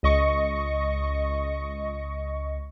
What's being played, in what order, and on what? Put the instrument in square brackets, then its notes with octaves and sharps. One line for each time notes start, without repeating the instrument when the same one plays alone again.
[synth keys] C#2 D#5 C#6 A#6 C#7